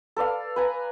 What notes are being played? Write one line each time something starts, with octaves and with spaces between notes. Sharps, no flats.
A4 B4 D5 F5
B4 G#5 A#5